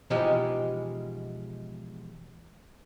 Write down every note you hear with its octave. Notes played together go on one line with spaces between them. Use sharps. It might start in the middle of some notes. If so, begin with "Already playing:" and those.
B2 E3 F3 G#3 D#4 G4